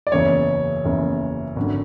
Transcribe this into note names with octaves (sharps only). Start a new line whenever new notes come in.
D5
F#1 E2 C#3 E3 C#5
F#1 E2 C#3 E3
G#1 F#2 D3